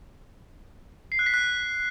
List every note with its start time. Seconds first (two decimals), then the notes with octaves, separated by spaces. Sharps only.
1.12 C7
1.19 F#6
1.26 B6
1.34 F#6